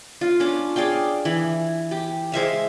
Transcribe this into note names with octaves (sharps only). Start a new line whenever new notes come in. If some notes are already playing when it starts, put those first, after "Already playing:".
F4
C#4 D4 D5
G#4 D5 F5 G5
E3
G4
G#3 C5 E5 F5